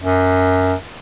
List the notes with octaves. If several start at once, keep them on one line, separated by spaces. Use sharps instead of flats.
F#2